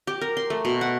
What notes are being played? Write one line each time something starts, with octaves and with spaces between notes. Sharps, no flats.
G4
A#4
C6
A3
B2
F#5